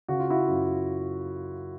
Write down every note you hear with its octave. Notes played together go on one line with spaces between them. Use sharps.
C#3 F#4
F4
E4 F#4
F#2